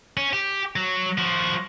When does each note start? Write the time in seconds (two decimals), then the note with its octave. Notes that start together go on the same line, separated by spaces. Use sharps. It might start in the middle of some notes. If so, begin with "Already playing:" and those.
0.17 C#4
0.33 G4
0.76 F#3
1.18 F3 F#4